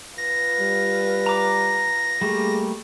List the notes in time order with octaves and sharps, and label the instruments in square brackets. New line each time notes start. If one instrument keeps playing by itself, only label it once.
[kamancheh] F4 B4 [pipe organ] A#6
[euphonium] G3
[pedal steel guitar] A#5 D6
[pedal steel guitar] G3 A3 A#3 [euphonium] G#4